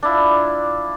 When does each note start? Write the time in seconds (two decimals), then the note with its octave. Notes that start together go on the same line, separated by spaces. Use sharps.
0.03 D4 E4 F4